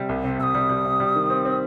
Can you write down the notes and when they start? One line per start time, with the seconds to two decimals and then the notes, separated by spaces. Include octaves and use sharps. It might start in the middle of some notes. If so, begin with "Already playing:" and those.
Already playing: C3 G3
0.09 C2
0.24 C3
0.39 C2 E6
0.43 D#6
0.55 G3
0.69 G3
0.85 C3
1.00 G3
1.15 D#3
1.30 C4
1.45 C4